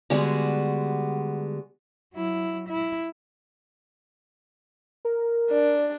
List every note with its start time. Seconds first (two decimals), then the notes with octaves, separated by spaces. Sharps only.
0.10 D3 G3 G#3 B3 D4 F#4
2.14 F#3 E4
2.69 E4
5.05 A#4
5.51 D4